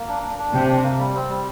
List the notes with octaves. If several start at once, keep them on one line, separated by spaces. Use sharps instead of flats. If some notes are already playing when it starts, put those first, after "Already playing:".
Already playing: A#3
D4
D4
D4
C3 G4
D4
A#3
G3
C4
G3